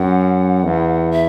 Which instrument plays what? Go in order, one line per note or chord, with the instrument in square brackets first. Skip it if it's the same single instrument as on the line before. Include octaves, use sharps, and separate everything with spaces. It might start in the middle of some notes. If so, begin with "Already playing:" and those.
Already playing: [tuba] F#2 [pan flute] F#5
[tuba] E2
[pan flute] E5